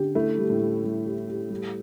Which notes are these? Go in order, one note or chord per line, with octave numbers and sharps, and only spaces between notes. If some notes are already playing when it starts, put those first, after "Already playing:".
Already playing: D3 G4
A3 E4
G3
A2
G3
G3
G4
G4
G3